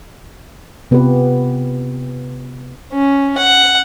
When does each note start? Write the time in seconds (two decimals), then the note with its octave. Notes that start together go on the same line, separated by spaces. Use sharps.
0.91 C3 B3 F4 G4 B4
2.92 C#4
3.37 F#5